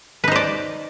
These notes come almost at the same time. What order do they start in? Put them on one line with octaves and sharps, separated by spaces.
B4 D#4 C5 D5